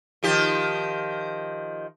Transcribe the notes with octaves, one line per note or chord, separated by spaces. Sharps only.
D#3 F3 G4